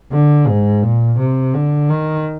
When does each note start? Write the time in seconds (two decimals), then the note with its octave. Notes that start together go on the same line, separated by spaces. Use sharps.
0.12 D3
0.47 G#2
0.82 A#2
1.19 C3
1.54 D3
1.89 D#3